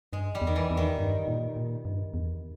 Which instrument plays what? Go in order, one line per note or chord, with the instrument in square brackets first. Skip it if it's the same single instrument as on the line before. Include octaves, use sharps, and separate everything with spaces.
[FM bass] G2 [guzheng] G#3
[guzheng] G3
[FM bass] E2
[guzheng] D#3
E3
[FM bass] E2
[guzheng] D#3
[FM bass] G2
A#2
A#2
G2
E2